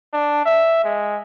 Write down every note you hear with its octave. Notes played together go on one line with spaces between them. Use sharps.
D4
E5
G#3